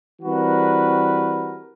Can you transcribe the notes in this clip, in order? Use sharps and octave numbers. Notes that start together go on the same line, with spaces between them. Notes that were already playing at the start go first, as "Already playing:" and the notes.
E3 G3 C4 F#4 A#4 B4